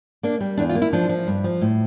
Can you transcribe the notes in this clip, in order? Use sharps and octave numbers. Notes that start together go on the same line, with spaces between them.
A#3 D4
G3
E2 D4
F4
A#3
E4
F3 D4
F3
G2
F3
A2